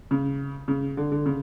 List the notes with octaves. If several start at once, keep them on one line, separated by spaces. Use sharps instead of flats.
C#3
C#3
D3
D3
C#3